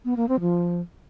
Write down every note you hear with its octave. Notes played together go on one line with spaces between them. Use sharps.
B3
A#3
C4
F3